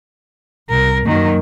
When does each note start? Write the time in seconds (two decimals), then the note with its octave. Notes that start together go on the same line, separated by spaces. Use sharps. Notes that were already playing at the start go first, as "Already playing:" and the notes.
0.70 C2 A#4
1.05 F#2 D#3 F#3 A#3